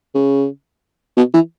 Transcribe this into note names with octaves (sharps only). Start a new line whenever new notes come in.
C#3
B2
E3